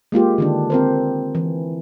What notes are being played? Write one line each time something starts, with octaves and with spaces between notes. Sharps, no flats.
G#3 A#3 F4 G4
D3 D#3 D4
C4 A#4 C5
E3